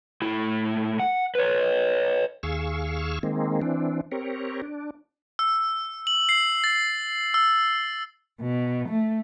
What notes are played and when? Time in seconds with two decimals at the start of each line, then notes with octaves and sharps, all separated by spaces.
0.22 A2 E4
1.00 F#5
1.35 B4 C#5
2.43 D#2 G#4 F5 C#6 E6
3.23 D#3 G#3 A#3 C4
3.62 E3 C4 D4
4.11 C4 G4 A#4 C#5
4.62 D4
5.39 E6
6.07 F#7
6.29 C7
6.64 A6
7.34 E6
8.40 B2
8.88 A3